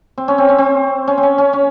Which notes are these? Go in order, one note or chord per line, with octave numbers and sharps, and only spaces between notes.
C4
C#4
C4
C#4
C4
C#4
C4
C#4
C#4
C#4